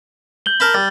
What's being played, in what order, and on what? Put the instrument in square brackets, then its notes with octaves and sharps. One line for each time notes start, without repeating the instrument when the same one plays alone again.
[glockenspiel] G6 F#7 G7
[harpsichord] A#4 A5 B5
[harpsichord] G3 [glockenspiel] A6